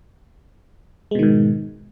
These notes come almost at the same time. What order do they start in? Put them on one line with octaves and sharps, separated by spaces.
G#3 B2 D#3 G#2